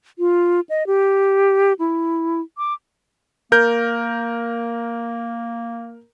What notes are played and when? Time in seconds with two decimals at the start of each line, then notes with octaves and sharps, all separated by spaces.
0.19 F4
0.69 D#5
0.87 G4
1.79 E4
2.58 D6
3.52 A#3 A#4 G6